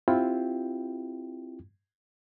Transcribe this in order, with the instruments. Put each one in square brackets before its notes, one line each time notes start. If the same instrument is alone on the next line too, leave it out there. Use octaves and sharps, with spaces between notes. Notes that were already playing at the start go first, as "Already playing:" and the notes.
[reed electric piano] C4 E4 F4 G4 G5